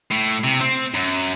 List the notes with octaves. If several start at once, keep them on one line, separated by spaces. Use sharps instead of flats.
A2
C3
C4
F#2